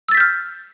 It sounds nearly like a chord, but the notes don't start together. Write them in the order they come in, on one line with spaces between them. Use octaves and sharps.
E6 A6 B6 G6 F6